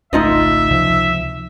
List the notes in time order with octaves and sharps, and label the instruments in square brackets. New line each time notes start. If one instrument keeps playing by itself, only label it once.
[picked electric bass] G#1 C#2 A3 [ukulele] D#4 F4 D#5 [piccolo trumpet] E5
[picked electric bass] C#2 C3 F3